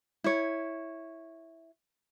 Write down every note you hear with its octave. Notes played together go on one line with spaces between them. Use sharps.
E4 C#5